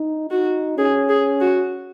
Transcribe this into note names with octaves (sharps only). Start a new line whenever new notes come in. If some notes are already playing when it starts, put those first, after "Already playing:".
Already playing: D#4
D#4 F#4
C#4 G#4
G#4
F#4